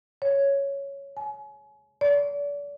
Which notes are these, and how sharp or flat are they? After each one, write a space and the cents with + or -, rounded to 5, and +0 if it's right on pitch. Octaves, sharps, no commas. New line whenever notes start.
C#5 +0
G#5 +35
D5 -35